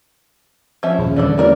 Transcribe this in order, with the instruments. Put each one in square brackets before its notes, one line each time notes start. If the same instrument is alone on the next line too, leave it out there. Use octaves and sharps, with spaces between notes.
[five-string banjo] F3 C#4 E5
[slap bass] D#1 [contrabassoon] C#3
[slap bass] E2 D3 G3 [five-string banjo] D4 A4 D5
[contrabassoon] A1 [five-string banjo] D4 A#4 D5